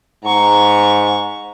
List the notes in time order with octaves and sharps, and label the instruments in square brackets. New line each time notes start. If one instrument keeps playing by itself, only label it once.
[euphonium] G#2 [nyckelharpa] A#5 C#6